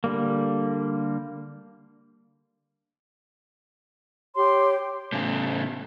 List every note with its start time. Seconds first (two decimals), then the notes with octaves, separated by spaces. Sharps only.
0.04 D3 G3 A#3
4.36 G4 C#5 C6
5.13 A2 C#3